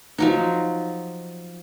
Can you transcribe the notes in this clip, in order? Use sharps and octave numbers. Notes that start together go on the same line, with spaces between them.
F3 F#3 D#4